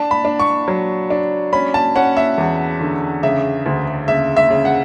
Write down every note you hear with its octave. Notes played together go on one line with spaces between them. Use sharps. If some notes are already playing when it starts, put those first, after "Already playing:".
Already playing: D4 A5
B5
D4
C#6
F#3
D4
C#4 B5
A5
C#4 F#5
E5
E2
D3
C#3 E5
D2
C#3 E5
E5
C#3
F#5